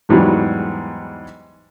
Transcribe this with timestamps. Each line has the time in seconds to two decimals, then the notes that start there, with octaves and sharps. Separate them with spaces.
0.09 E2 G#2 E3 F#3 G3